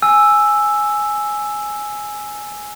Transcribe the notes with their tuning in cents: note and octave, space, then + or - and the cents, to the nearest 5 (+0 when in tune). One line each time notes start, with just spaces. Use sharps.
G#5 +0 E6 +0